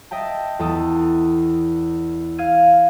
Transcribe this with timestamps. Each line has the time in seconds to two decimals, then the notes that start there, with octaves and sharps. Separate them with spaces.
0.11 D#5 E5 G5 A5
0.59 E2 A4 D#6
2.38 F5 F6 G#6 D#7